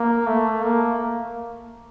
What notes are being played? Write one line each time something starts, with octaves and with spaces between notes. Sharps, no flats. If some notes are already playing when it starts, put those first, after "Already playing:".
Already playing: A#3
A3
A#3